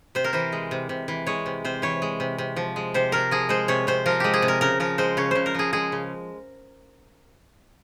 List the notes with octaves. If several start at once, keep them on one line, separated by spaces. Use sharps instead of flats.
C3 C5
A#4
E3 C5
G#3
C3
C3
E3
G#3 C#5
C3
C3 C5
E3 C#5
G#3
C3
C3
F3
G#3
C3 C5
C3 A#4
F3 G#4
G#3 C5
C3 C#5
C3 C5
F3 A#4
G#3 G4
G#4
C3
A#4
C#3 A#4
F3 A#4
G#3 C5
C#3 C#5
C#3 C5
A#4
F3 G#4
G#3 G#4
C#3